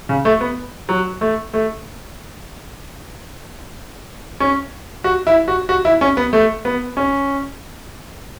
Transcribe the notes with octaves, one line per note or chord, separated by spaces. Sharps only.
C#3
A3
B3
F#3
A3
A3
C#4
F#4
E4
F#4
F#4
E4
C#4
B3
A3
B3
C#4